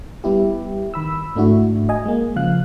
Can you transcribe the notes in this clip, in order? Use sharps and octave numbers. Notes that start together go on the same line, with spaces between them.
G3 B3 E4 G4
D#3 B5 E6
G#2 A3 D4 E4 F#4
D#5 G#5
G#3 A#3
C#3 F3 F5 F#6